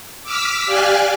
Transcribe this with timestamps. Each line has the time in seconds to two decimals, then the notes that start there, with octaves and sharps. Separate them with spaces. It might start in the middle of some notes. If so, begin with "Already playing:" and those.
0.24 D6 E6 F6 B6
0.66 G4 D5 F5 G#5 F6 F#6